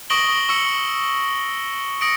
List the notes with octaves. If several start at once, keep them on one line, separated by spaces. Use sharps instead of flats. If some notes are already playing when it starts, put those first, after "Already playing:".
C#6 D#6 A#6 D7 F#7 G7
C#6 E6 C#7
D#6 A#6 C#7 D7